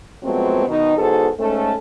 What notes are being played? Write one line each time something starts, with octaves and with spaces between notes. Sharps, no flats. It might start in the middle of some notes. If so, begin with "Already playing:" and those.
F3 F#3 G#3 A3 B3 C4
B2 D#3 D#4
E2 G#2 F#4 G#4 A4 C5
G#2 A3 C#4 A4